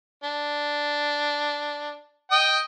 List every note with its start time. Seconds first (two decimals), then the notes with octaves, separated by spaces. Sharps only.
0.24 D4
2.32 D#5 G5 D#6